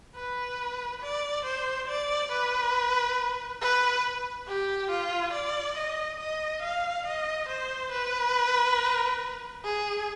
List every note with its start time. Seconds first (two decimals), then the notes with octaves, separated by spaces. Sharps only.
0.16 B4
1.02 D5
1.45 C5
1.88 D5
2.31 B4
3.61 B4
4.47 G4
4.90 F4
5.33 D5
5.77 D#5
6.20 D#5
6.62 F5
7.06 D#5
7.49 C5
7.92 B4
9.64 G#4